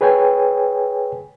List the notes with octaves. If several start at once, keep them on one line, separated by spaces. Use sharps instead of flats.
G#4 B4 C#5 G5 G#5